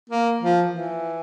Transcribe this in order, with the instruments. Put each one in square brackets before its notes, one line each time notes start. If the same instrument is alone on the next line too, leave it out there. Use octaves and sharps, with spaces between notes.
[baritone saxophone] A#3
F3
E3